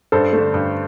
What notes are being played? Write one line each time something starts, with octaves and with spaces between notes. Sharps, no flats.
G2 A4 C5
A3
D3
G2